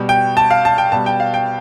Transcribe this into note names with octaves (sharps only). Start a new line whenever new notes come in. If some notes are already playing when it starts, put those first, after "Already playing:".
Already playing: B2 G3
G5
A5
F5
A5
G5
B2 G3 A5
G5
F5
G5